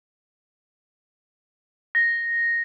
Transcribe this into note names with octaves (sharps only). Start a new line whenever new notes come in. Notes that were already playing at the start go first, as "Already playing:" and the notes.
A#6